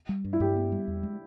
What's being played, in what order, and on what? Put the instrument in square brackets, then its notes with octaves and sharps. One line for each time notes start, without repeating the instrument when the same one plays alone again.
[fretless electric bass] G3
G2
[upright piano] E4
[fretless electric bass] G2 [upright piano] G4
[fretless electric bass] B3
G3
E2
G#3